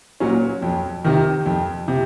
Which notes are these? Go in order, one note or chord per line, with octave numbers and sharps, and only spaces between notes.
A#2 F#3 C#4
F2
C3 D#3
F2
C3